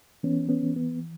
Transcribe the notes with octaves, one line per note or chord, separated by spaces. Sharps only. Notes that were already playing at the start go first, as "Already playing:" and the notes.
E3 B3 C#4
B3 C#4
E3
B3